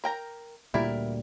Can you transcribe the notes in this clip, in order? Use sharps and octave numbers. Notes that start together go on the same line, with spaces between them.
A#4 G5 A#5
D2 A#2 G3 E4 A#4